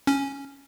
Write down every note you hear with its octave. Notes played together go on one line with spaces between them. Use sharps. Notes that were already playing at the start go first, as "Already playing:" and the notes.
C#4